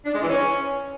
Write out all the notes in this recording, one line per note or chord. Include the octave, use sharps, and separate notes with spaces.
D4
G#3
E3
C#4